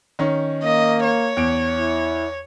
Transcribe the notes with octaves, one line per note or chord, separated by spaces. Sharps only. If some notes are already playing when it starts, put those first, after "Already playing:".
D#3 C#4
A#3 D#5
C#5
E2 D7
E4